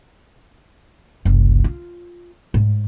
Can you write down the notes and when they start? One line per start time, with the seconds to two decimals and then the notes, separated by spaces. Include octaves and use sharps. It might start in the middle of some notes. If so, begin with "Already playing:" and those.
1.25 F#1 C2
1.64 F4
2.54 G#2